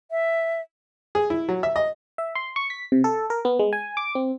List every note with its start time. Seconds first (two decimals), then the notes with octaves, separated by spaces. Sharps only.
0.11 E5
1.15 G#4
1.30 E4
1.49 F#3
1.63 E5
1.76 D#5
2.18 E5
2.35 C6
2.56 C#6
2.70 B6
2.92 C3
3.04 A4
3.30 A#4
3.45 B3
3.59 G#3
3.73 G#5
3.97 D6
4.15 C4